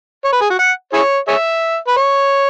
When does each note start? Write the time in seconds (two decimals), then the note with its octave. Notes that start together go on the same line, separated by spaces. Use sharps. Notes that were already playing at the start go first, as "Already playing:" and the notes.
0.25 C#5
0.33 B4
0.41 G#4
0.50 F#4
0.59 F#5
0.93 E4 G#4 C#5
1.28 G#4 C#5 E5
1.88 B4
1.97 C#5